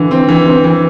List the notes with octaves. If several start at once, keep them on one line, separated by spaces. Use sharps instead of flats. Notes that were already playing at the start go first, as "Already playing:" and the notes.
Already playing: D3 E3
C4
E3
C4
E3